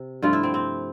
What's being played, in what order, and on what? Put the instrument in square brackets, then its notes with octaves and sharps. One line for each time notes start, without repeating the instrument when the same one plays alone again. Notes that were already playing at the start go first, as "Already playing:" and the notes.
Already playing: [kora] C3
G2 F3 A3 F4
E4
C4
C4